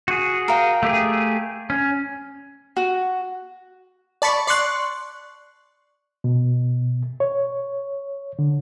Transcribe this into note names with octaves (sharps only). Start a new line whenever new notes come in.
F#4 G#4
A#4 F5 G5
A3 G4 G#4
C#4
F#4
D5 A5 B5 C#6
D5 C6 C#6 F#6
B2
C#5
D3